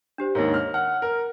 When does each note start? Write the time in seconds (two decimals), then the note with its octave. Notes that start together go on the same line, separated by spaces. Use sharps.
0.18 D4 G4 C5
0.35 D#2 G#2 A#4 C#5 A#6
0.54 F6
0.74 F#5 F6
1.02 A#4